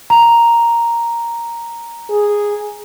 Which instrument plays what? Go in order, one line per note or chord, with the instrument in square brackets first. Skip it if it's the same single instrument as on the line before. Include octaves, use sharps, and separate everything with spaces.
[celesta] A#5
[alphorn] G#4